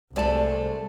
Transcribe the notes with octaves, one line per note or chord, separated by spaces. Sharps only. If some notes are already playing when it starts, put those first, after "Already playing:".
C2 G#3 A3 C5 D5 A5